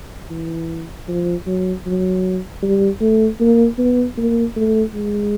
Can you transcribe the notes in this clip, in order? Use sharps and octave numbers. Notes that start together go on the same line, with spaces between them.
E3
F3
F#3
F#3
G3
A3
A#3
B3
A#3
A3
G#3